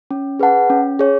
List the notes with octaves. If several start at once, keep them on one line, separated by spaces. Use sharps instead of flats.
C#4
G#4 B4 F#5 A5
C#4
G#4 C#5